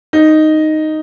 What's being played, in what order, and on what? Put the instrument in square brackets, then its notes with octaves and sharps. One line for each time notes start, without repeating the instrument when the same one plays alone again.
[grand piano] D#4